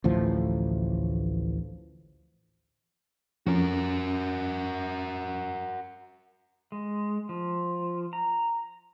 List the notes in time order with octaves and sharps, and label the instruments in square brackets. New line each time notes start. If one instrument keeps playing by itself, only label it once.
[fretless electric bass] A1 D2 A2 F3
[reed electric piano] F2 C#4 [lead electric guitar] F#4 A#4
[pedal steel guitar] G#3
F3
A#5